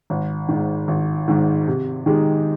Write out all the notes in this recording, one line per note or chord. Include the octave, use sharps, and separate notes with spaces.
G#1
G#2 D#3
G#1
G#2 D#3
C3
D#3 G#3 D#4 G4